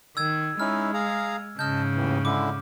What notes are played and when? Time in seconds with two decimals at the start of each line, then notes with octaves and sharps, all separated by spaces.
0.17 D#3 E6 G#6
0.60 G#3 C#4 D#4 E4 F6
0.94 G#4 F5 A#5
1.59 G#2 C#3 D#5 A5 F6 G6
1.95 D#2 A2 E3
2.25 D3 G#3 E4 D6